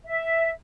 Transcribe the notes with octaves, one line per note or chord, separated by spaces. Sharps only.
E5